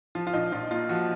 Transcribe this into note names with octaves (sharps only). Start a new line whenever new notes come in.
F3 F4
F4
A#1 D#4
A#1 F4
A#2 F4
F3 F#4